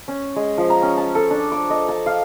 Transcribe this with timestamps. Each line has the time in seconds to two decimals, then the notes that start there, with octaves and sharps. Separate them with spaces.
0.08 C#4
0.36 G#3
0.58 F3
0.70 A#5
0.82 C#4
0.97 A5
1.15 A4
1.30 D4
1.52 D6
1.70 D#5
1.88 A5
2.06 F5